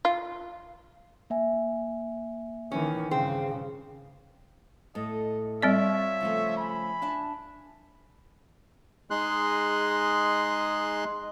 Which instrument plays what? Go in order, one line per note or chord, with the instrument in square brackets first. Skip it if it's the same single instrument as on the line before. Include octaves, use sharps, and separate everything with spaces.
[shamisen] F4
[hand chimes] A#3 E5 G#5
[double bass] D#3 E3 [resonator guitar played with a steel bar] C#4
[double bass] G2 C#3 [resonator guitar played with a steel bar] C4 [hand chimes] G#4 F5
[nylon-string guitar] A2 A4 [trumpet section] D#5
[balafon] G3 C4 D5 [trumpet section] F4 C#5 E5
[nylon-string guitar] C#3 F3 A3
[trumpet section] G#5 B5
[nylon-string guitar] D4 E5 A5
[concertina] G#3 D#4 G#4 C6 F#6